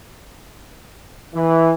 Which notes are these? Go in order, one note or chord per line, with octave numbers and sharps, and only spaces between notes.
E3